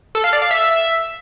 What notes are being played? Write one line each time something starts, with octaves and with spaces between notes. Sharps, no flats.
A4
F5
D5
F5
E5